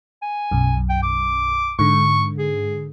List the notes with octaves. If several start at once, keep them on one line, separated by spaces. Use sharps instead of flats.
G#5
B1 F#2
G5
D6
G#2 D3 C#6
G#4